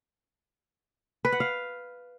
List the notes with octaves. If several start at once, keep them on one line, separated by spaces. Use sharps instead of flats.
B4
F#5
F5